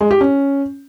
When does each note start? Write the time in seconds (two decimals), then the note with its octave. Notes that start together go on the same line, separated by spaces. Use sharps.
0.01 G#3
0.11 G4
0.21 C#4